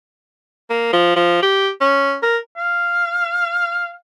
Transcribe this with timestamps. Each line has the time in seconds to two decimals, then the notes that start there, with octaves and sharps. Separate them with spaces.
0.70 A#3
0.93 F3
1.16 F3
1.42 G4
1.81 C#4
2.23 A#4
2.57 F5